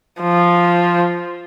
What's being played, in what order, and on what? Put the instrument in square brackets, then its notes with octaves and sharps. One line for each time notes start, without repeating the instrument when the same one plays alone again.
[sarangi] F3